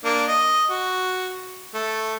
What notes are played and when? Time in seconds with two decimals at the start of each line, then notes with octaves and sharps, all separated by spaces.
0.04 A#3 D4
0.28 D#5
0.70 F#4
1.74 A3